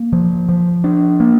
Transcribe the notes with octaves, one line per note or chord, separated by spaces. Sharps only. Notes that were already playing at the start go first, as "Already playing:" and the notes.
Already playing: A#3
F3
F3
D4
A#3